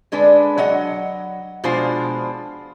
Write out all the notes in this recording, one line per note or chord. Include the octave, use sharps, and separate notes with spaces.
D3 G#3 D4 B4
F#3 D#5 F#5
B2 F3 G#3 D4 F4 C5